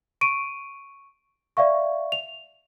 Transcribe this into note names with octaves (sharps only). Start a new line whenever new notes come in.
C#6 D7 D#7
D5 E5 F5 C#6
F7